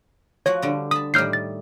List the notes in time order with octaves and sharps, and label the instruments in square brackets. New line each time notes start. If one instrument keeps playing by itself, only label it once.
[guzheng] F3 F#4 F#5 [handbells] C#5
[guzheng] D3 G3
[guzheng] A5 B5 [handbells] D#6
[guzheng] A2 D#3 G3 [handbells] F6 G6 C7
[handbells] A6